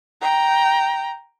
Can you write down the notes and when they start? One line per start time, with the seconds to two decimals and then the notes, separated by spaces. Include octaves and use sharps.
0.22 G5 A#5